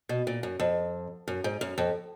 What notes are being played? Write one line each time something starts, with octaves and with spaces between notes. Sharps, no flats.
B2
A#2
F#2
F2
F#2
G#2
F#2
F2